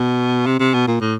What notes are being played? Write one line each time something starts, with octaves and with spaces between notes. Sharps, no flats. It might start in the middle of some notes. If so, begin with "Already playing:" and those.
Already playing: B2
C3
C3
B2
A#2
A2